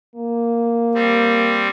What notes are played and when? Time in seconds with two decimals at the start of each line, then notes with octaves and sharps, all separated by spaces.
0.15 A#3
0.94 G3 C4